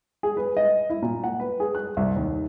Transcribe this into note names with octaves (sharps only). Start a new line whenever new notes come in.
G#4
B4
D#5
E4
A#2
F#5
B4
G#4
F#6
C2
D#2